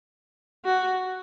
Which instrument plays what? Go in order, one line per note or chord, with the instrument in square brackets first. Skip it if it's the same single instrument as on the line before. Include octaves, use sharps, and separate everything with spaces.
[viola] F#4